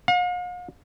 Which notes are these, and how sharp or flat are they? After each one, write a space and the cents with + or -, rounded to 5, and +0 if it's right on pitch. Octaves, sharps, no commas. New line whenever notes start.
F5 +45